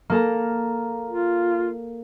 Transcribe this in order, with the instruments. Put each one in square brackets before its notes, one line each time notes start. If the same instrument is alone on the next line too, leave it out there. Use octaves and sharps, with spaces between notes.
[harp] A#3 A4 A#5
[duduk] F4